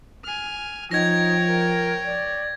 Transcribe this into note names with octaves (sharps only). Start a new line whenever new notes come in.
G#5 F6
F3 D#4 C#5 G5 G#6 A#6
A#4
D5